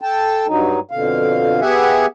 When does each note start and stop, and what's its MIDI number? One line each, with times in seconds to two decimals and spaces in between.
0.01 0.47 69
0.01 0.47 79
0.01 0.47 81
0.47 0.80 43
0.47 0.80 54
0.47 0.80 63
0.91 1.60 41
0.91 1.60 47
0.91 1.60 50
0.91 1.60 77
1.61 2.06 59
1.61 2.06 67
1.61 2.06 68
1.61 2.06 76
1.61 2.06 78
1.61 2.06 80